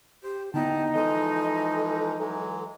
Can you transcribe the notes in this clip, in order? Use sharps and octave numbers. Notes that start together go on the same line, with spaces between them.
G4 C5
D3 B3 D#4 E4 G5 A5
E3 F3 G#3 A4 D#5
E3 F#3 G#3